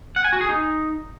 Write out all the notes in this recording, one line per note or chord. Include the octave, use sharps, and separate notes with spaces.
F#5
G#5
F#4
G#4
D#4